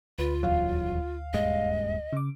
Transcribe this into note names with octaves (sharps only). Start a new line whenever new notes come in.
D2 F4 B4
D#1 E2 F#3 F5
D#1 G2 G#3 D#5
C#3 D6